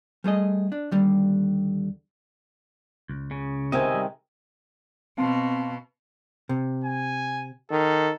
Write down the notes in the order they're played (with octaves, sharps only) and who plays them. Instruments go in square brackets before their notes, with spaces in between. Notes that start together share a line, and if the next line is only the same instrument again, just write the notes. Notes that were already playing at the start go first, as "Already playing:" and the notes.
[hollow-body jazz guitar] G3 A3 G#4 D#5
D4
D#2 D3 G3
[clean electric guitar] C#2
[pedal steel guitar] C#3
[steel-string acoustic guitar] C3 D#3 G#3 [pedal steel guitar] D#5 E5 G#5
[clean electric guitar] G3
[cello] B2 [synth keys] C4 [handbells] F5 A5 C6
[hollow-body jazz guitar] C3
[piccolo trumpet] G#5
[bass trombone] D#3 [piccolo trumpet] A4